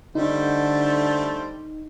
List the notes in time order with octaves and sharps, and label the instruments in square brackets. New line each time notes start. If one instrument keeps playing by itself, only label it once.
[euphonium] D3 [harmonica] G3 A3 C5 [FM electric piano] D#4